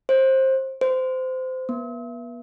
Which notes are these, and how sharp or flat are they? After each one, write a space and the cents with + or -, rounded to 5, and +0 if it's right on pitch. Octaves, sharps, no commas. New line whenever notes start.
C5 +20
C5 -20
B3 -35